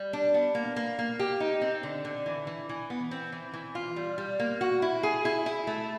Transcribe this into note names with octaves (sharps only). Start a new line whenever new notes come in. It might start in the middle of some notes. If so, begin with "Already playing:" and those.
Already playing: G3
D4
B3
A#3
A#3
A#3
G4
D#4
C4
D3
D3
E3
E3
E3
B3
C4
E3
E3
F4
G3
G3
A#3
F#4
E4
G#4
E4
E4
A3